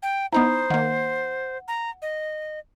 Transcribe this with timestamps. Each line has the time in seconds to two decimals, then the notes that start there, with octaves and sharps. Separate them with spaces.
0.03 G5
0.33 B3 D#4 E4 C5 A#5 B5 D#6
0.70 D#3 A#3 F#5
1.68 A#5
2.02 D#5